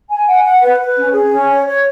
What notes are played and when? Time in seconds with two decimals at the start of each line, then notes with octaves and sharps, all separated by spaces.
0.10 G#5
0.28 F#5
0.44 F#5
0.62 B4
0.79 B4
0.97 C#4
1.13 G#4
1.31 C#4
1.49 C#5
1.66 C#5